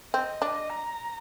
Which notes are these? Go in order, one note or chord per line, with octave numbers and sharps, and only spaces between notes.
C4 D#5
D4
A#5